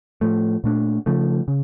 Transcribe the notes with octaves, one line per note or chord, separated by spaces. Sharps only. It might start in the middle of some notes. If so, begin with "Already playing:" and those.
A2 F3 A3
A#2 A3 D4
C#3 F3 A3
C#3